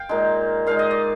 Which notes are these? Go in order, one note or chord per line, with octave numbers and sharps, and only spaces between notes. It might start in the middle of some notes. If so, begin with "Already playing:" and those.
Already playing: F5 G5
A#2 G#3 D#4
A#2 G#3 D#4 F5
D#5
D5